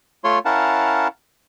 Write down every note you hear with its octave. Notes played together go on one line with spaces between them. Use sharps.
A3 F4 C#5 C6
C#4 E4 A#4 F5 F#5 A5